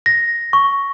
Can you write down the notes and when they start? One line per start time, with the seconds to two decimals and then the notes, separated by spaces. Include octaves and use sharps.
0.06 A#6
0.53 C#6